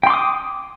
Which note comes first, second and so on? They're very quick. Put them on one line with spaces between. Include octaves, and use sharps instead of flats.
G5 C6 D6 D#6